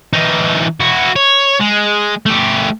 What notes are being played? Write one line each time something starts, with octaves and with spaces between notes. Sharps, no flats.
E3 D#4
E4 F#4
C#5
G#3
A3 G4